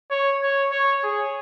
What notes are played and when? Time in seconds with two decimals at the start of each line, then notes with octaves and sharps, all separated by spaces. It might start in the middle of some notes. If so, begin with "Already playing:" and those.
0.11 C#5
0.42 C#5
0.72 C#5
1.04 G#4